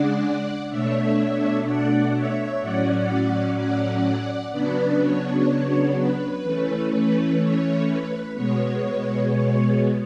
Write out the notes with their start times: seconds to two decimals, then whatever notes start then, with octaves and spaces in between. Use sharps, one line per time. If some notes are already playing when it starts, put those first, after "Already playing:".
Already playing: C#3 G#3 D4 D5 F#5
0.69 B2 A3 D4 C#5 E5
1.64 D5 F#5
2.13 C#5 E5
2.60 A2 F#3 C#4 D5 F#5
3.56 D5 F#5
4.51 C#3 F#3 B3 D4 B4 D5
4.99 C#5
5.95 B4
6.42 E3 A3 C#4
6.91 B4
7.38 C#5
7.86 B4
8.34 B2 G#3 B3 C#5
9.30 C#5